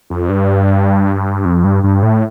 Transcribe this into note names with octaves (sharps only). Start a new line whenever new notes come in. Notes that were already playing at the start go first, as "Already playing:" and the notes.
F2
G2
F2
G2
G2
A2